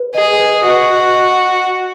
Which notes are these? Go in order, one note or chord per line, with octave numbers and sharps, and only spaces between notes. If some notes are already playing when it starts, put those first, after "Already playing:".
Already playing: B4
G#4 D#5
B4
F#4 D#5